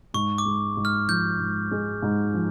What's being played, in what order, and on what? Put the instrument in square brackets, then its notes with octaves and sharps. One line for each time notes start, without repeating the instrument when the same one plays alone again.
[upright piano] G#2 [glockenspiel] C#6
[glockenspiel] D6
[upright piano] G#3
G#2
[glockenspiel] F6
[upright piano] F3 [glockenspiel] G6
[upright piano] G#2
G#3
G#2
F3